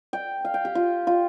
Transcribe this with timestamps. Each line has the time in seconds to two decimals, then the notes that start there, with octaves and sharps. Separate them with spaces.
0.13 G5
0.45 F5
0.54 G5
0.65 G4
0.75 F4
1.07 F4